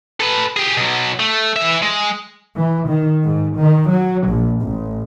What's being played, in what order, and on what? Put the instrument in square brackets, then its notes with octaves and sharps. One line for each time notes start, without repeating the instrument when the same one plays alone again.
[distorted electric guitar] A4 B4
G4 G#4
B2 F#3
A3
E3 E5
G#3
[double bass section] E3
D#3
G#2
D#3
F#3
A#1
A1